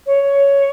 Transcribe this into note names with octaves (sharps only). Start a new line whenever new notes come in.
C#5